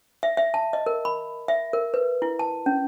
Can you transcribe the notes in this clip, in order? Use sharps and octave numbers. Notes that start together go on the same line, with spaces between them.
E5
E5
A5
D#5
A#4
B5
E5
A#4
B4
E4
A5
C#4